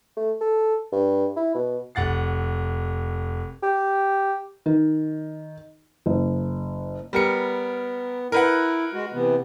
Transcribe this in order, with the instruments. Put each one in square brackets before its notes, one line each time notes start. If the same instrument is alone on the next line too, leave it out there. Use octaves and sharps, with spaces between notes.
[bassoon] A3
A4
G2
E4
B2
[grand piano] F1 F#5 A6 C7
[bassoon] G4
[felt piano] D#3
F#1
[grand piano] G3 A#4 C#7 [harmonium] B3
[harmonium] E4 [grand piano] A#4 B4 F#5
[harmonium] G#3 F#4
C3 E3 B3